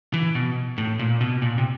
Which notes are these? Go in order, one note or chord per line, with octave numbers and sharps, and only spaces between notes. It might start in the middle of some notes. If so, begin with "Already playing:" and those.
E3
B2
A2
A#2
B2
A#2
C3